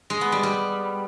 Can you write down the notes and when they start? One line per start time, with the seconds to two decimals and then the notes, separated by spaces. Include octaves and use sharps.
0.10 G#3
0.21 B3
0.32 G3
0.43 G3